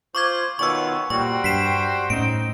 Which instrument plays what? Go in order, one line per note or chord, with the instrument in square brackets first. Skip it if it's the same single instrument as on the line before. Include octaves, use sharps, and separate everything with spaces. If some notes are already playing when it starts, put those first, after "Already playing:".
[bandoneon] F4 C5 [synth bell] C#6 D6 G#6
[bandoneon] B2 D#3 F4 [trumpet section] B3 C#5 G#5 [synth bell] C#6 E6
[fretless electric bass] A#2 [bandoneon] G3 [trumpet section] F#4 C5 G5 [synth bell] C#6
[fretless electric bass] G2 [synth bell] B6 C7 E7
[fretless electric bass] A2 C#4 [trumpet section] C4 D#4 [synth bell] D7